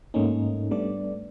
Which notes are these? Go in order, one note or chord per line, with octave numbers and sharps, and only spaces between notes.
G#2 A3 A#3 C#4 D#4
G3 A3 B3 D4 D5